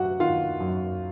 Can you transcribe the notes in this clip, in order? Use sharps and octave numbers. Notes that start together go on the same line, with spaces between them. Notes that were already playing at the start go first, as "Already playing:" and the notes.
Already playing: F#2 F#3 F#4 G4 F#5
D#3 F4 F5
F#2